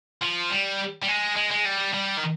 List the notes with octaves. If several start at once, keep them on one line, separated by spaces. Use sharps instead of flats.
F3
G3
G3
G#3
G#3
G#3
G3
G3
D#3